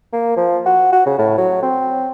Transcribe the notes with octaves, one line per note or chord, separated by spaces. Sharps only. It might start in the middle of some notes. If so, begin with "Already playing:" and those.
A#3
F3
F#4
F#4
C#3
A2
F#3
C4